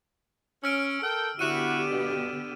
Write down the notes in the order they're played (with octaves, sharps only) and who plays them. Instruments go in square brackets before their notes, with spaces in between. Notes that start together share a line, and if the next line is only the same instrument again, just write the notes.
[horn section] C#4 [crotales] E6 F6 D7
[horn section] A4 A#4 G5
[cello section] D3 B3 G4 [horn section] E4 F#4 [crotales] D#7 E7
[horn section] G2 B2